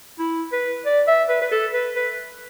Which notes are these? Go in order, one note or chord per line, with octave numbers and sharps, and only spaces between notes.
E4
B4
D5
E5
B4
B4
A4
B4
B4